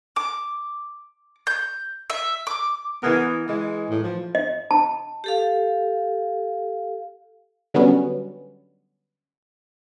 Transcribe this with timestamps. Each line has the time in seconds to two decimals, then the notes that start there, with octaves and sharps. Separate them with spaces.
0.16 D6
1.47 G6
2.10 E5
2.47 D6
3.03 E3 B3 G#4 A#4
3.49 E3 G#3
3.90 A2
4.04 F3
4.35 D#5
4.71 A5
5.24 G4 A4 F5
7.74 D3 F#3 G3 B3 C#4